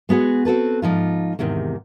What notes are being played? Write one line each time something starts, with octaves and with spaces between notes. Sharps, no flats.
G#3 B3 F#4 G#4
C4 F#4 A4 B4
G#2 F3 D#4 F4
E2 G#2 C3 D#3